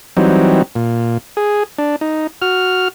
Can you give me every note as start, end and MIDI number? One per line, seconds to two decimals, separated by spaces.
0.17 0.62 52
0.17 0.62 54
0.17 0.62 55
0.17 0.62 60
0.17 0.62 63
0.76 1.18 46
1.37 1.63 68
1.78 1.96 62
2.01 2.27 63
2.42 2.88 66
2.42 2.88 89